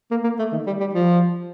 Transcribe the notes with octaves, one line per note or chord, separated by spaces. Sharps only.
A#3
A#3
A3
D#3
G3
G3
F3